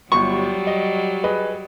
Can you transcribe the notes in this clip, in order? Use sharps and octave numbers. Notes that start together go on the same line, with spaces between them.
G1 F#3 G3 F#4 C#6
D#5
G#4 B4 D#5